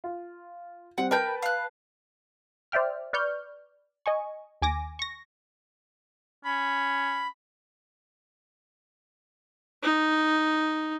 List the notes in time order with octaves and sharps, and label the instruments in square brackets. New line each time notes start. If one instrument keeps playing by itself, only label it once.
[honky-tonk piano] F4
[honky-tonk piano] G3 C4 [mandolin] F#5
[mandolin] A#4 G5 G6 [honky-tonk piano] B4 A5
[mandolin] F5 F#6
[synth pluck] C5 D5 E5 G5 F6
B4 D5 C#6 F6 G6
D#5 G#5 C#6
D#2 G#5 D6 A#6
C#6 A#6
[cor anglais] C#4 [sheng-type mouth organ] B5
[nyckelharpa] D#4